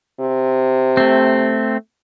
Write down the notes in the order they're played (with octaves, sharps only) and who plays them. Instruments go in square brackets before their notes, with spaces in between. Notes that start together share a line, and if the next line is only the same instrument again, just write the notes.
[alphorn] C3
[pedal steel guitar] A3 C4